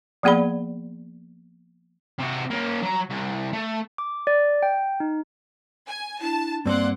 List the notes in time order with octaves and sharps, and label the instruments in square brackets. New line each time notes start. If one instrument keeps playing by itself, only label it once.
[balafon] F3 A#3 B3 G#4 D5 B5
[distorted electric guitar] C3 F#4
A#3 C#4
F#3 A#5
C2
A3
[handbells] D6
D5
G5
D#4
[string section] G#5
[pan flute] D4 [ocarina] E4 [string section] A5
[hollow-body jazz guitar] G2 C4 [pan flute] A#3 [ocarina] D5 [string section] F#5 C6 D6